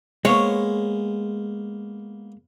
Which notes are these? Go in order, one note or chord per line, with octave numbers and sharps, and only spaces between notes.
G#3 A#3 B3 C#5